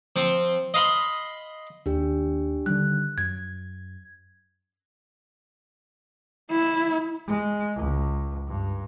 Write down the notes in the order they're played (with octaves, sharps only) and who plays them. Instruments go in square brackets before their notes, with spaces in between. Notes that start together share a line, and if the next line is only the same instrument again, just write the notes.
[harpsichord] F3 C4
D#5 F5 B5 C6
[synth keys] D#2 [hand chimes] D4 G4
[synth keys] D3 D#3 G3 [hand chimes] F#6
[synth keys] F#2 [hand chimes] G#6
[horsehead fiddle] E4
[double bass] G#3
C#2
G2